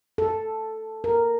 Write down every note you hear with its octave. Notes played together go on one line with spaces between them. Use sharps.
A4
A#4